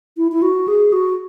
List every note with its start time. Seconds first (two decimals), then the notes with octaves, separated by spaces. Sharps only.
0.17 E4
0.32 E4
0.42 F#4
0.68 G#4
0.93 F#4